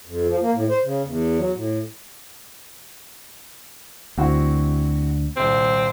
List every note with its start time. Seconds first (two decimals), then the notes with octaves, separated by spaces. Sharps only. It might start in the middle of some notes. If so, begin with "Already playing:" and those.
0.06 F2
0.28 F3
0.41 A#3
0.54 A2
0.70 C5
0.84 C#3
1.05 E2
1.38 F#3
1.55 A2
4.18 D2 C4 E4 F#4
5.36 D#1 C2 C4